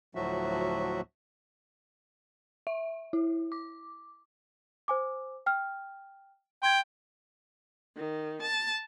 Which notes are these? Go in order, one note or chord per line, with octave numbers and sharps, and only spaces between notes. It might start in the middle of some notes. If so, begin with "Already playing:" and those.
D2 A2 F3 F#3 F#4 E5
E5
E4
D6
C5 G#5 D6
G5 F6
G5 C6 G#6
D#3
A5